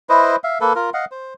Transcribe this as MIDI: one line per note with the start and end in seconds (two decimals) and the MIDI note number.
0.09 0.36 64
0.09 0.36 71
0.09 0.36 72
0.09 0.36 75
0.44 0.58 76
0.44 0.58 77
0.61 0.73 58
0.61 0.73 69
0.61 0.73 71
0.75 0.90 65
0.75 0.90 70
0.94 1.05 75
0.94 1.05 77
0.94 1.05 78
1.11 1.34 72